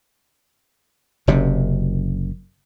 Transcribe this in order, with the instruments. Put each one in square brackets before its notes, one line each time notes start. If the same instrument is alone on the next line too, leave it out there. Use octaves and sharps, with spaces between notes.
[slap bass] F#1 F#2 C3